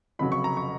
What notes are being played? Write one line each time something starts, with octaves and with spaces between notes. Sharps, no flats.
F1 F2 C#3 F#3 B5
C#6
A#5
C#6